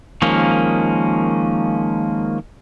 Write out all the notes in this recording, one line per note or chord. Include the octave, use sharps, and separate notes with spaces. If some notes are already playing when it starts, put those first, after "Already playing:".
D#3 F3 G#3 A#3 C#4